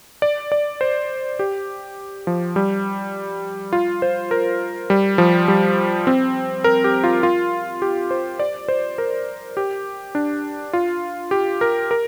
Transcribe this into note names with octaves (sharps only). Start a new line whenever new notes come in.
D5
D5
C5
G4
F3
G3
F4
C5
A#4
G3
F3
G3
C4
A#4
G4
F4
F4
G4
C5
D5
C5
A#4
G4
D4
F4
G4
A#4
A#4